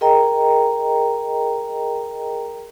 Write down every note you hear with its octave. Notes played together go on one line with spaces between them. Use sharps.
G#4 A#4 D#5 G5 A#5